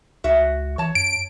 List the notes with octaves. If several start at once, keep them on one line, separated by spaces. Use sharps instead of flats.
C#2 F#4 E5
E3 C#5 A5
F#2 D7